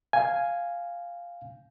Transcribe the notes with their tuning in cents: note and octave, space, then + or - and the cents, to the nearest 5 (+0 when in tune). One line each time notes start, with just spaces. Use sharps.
F5 +0 G#5 +0